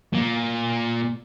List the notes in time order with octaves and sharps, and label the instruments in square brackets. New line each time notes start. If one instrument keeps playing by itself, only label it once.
[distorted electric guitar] A#2 A#3